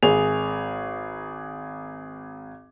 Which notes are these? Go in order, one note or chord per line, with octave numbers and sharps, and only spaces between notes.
G#1 G#4 F7